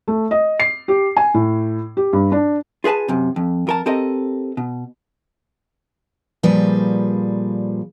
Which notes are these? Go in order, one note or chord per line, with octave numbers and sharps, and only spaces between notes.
A3
D#5
C7
G4
G#5
A2
G4
G2
D4
F4 G#4 B4 G#5 A5
F#2 C3
F2
F2 A#4 A5
C4 G4 A4 A#4 D#5
B2
A#2 F3 G3 G#4 B4